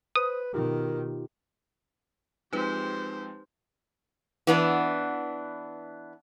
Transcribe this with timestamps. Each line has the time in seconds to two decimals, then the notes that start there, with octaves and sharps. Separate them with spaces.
0.16 B4 C5 D#6
0.54 B2 D#3 D#4 F4 G4 A#4
2.53 F3 G#3 C4 D#4 G4 B4 C5
4.47 E3 B3 D4